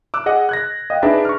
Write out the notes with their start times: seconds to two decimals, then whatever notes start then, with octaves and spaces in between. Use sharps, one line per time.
0.14 D6 E6 F#6
0.26 G#4 D#5 F#5
0.49 F#6 G#6 A#6
0.90 D#5 F5 G5
1.03 D4 D#4 G#4 B4 D5 E5
1.25 C#6 F6